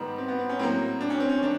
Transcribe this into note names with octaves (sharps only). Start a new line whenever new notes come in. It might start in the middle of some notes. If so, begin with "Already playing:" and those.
Already playing: G#2 D#3 G3 B3
C4
B3
C4
C#4
A2 F#3 A#3 C4
D4
C#4
C4
C#4
D#3 D4